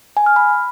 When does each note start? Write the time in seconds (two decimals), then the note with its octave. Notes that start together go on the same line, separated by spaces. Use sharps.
0.17 G#5
0.26 F6
0.36 B5